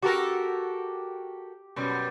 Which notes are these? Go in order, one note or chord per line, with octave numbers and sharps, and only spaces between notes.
F#4 G4 A4 A#4
F#2 B2 G3